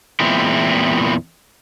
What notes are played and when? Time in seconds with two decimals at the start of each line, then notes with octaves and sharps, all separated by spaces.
0.20 E2 A#2 G#3 C4 E4